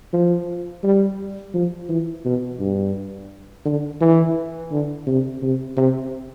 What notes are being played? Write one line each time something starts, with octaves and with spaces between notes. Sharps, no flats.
F3
G3
F3
E3
B2
G2
D3
E3
D3
C3
C3
C3